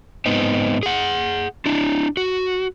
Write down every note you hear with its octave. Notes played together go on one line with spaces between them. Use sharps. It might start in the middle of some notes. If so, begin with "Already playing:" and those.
G#2 B3 C4 D#4
G#4 F#5
D4 E4
F#4